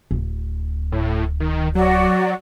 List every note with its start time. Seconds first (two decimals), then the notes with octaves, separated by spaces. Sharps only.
0.11 D1
0.92 A2
1.40 D#3
1.75 F#3 F#4 D5